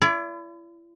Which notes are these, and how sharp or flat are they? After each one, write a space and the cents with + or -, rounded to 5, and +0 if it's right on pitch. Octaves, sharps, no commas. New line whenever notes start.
E4 +35 D5 -35